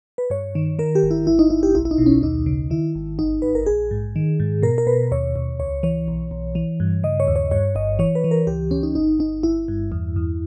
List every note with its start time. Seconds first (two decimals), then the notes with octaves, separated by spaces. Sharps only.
0.18 B4
0.30 G2 C#5
0.55 D#3
0.79 D#3 A#4
0.95 G4
1.03 G1
1.11 E4
1.27 G1 E4
1.39 D#4
1.50 G1 E4
1.63 G4
1.75 B1 E4
1.85 E4
1.91 D#4
1.98 B2
2.06 C#4
2.23 D#2 D#4
2.46 C#3
2.70 D#3 E4
2.95 G#1
3.19 G1 D#4
3.42 G1 B4
3.55 A#4
3.66 A#1 G#4
3.91 G#2
4.16 D#3
4.40 G#2
4.63 B2 A#4
4.78 A#4
4.87 B2 B4
5.12 D#2 C#5
5.36 D#2
5.59 C#2 C#5
5.83 E3 C#5
6.08 B1
6.31 B1
6.55 E3
6.80 G2
7.03 C#3 D#5
7.20 C#5
7.28 D#2
7.36 C#5
7.51 G2 C#5
7.75 G1 D#5
7.99 E3 C#5
8.15 B4
8.24 E3
8.31 A#4
8.47 C#2 G4
8.71 C#2 C#4
8.83 D#4
8.95 G1 D#4
9.19 G1 D#4
9.43 G1 E4
9.68 G2
9.92 E2
10.16 E2